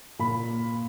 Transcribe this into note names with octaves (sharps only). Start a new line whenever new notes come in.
A#2 B5